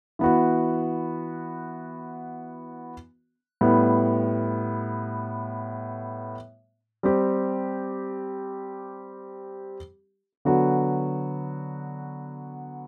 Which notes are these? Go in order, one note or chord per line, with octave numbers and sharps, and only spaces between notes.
E3 B3 F#4
A2 G3 B3
G3 C4 G4
D3 F#3 B3 F#4